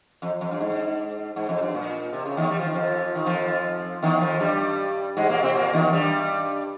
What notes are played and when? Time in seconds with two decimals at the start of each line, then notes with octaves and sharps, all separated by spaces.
0.22 F2
0.41 F2
0.51 G2
0.60 G#2
1.36 G#2
1.49 F2
1.62 G2
1.75 A#2
2.13 C3
2.25 C#3
2.37 D#2 D#3
2.50 G3
2.59 F3
2.66 D#3
2.74 F2 F3
3.15 D#3
3.26 F2 F3
4.02 D#2 D#3
4.21 F2 F3
4.40 G2 G3
5.17 G#2 G#3
5.29 A#2 A#3
5.42 C3 C4
5.55 A#2 A#3
5.73 D#2 D#3
5.93 G2 G3